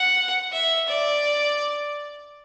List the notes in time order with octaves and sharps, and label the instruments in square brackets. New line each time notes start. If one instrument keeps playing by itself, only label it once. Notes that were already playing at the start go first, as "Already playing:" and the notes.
Already playing: [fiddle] F#5
E5
D5